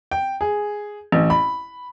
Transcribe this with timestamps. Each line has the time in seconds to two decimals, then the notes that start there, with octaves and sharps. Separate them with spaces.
0.11 G5
0.41 G#4
1.12 A1
1.30 B5